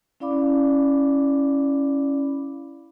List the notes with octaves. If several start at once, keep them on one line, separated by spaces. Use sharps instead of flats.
C#4 E4 D5 F5 B5 D6